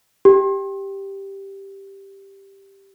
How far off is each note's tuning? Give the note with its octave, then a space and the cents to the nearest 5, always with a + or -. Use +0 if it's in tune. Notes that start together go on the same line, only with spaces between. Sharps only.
G4 +0